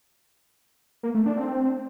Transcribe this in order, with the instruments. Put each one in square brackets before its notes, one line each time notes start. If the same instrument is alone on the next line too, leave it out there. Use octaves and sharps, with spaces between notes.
[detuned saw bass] A#3
A3
D4
C4